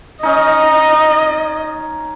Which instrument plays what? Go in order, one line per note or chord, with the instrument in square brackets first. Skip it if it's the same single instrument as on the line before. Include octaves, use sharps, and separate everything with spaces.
[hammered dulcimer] C#4 D#4 [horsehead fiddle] D#5